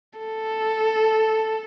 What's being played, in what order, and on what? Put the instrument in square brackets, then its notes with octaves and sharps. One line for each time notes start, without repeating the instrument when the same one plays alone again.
[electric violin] A4